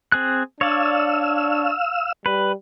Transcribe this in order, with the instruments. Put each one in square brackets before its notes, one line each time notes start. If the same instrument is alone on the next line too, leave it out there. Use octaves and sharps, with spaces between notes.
[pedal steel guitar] C4 G#4 F#6
[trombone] D4 [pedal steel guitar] C#5 D5 [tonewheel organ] F5 E6
[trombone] G3 [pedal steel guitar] B4